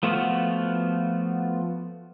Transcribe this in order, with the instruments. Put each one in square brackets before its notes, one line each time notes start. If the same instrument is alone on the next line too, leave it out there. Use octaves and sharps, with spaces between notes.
[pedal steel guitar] F3 A3 B3 F4 F#4